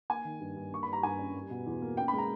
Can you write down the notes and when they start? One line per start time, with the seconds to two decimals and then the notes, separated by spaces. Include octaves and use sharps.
0.10 A#3 G#5
0.25 D#3
0.40 G2
0.56 G2
0.72 A#3 C#6
0.83 B5
0.88 G3
0.93 A#5
1.03 G2 G#5
1.19 C#4
1.35 G3
1.50 B2
1.66 E2
1.82 A#3
1.97 C#4 G5
2.08 B5
2.13 G#3 A#5